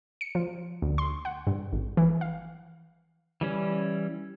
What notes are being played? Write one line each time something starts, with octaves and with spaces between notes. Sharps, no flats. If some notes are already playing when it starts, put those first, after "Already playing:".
C#7
F3
D2
C6
F#5
G2
G#1
E3
F5
E3 G3 C#4